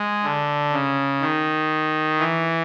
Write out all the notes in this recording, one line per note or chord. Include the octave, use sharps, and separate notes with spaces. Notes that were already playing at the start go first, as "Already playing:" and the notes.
Already playing: G#3
D3
C#3
D#3
E3